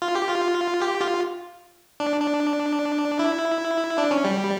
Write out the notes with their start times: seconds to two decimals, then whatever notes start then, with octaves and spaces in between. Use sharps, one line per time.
0.02 F4
0.15 G4
0.29 F4
0.82 G4
1.01 F4
2.00 D4
2.21 D4
3.19 E4
3.98 D4
4.11 C#4
4.25 G3